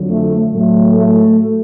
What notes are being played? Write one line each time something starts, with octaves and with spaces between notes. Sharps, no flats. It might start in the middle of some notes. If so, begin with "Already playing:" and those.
Already playing: F2 D3 F#3
A3
A2 F#3 A3
A3